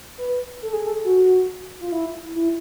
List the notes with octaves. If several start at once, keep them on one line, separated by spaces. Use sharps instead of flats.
B4
A4
G#4
A4
F#4
F4
E4
E4